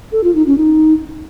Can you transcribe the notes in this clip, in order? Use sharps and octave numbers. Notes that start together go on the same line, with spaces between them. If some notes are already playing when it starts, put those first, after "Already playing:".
A4
F4
D#4
C#4
D#4